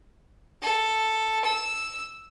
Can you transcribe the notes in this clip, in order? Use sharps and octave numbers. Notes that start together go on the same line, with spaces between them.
A4
E6